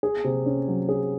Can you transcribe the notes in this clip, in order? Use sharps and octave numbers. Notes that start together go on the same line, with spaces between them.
G#4
C3
C#4
F#3
G#4